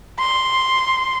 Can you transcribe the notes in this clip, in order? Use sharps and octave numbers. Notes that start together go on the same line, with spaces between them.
C6